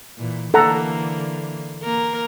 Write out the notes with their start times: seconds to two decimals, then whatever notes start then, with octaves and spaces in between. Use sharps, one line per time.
0.18 A#2 E3
0.54 D3 E3 A#3 A4 F#5 A#5
1.83 A#3 A#4